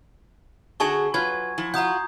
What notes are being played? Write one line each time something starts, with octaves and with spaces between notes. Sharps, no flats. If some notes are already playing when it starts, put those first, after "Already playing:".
D3 D4 F#4 G#4 G#5 A5 C#6
F#3 F4 B4 G#6
F3 E4
F4 F#4 A#5 D#6 G6